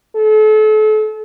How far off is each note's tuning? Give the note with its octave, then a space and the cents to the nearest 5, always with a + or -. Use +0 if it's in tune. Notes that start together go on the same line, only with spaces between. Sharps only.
A4 -35